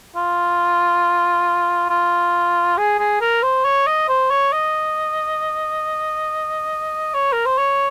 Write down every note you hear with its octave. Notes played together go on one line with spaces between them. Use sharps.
F4
F4
G#4
G#4
A#4
C5
C#5
D#5
C5
C#5
D#5
C#5
A#4
C5
C#5